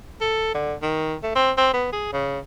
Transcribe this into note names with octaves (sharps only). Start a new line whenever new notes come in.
A4
D3
D#3
A3
C4
C4
B3
G#4
C#3